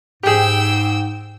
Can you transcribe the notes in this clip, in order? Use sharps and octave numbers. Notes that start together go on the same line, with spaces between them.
G#2 G4 G#4 G5 E6